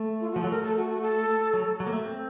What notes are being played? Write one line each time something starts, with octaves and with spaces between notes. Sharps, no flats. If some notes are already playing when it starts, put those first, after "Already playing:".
Already playing: A3
F4
F3 F#4
F#3 A4
A3 A#4
A4
F#4
F#4
A4
F#3
F#3
A#3
A3
C4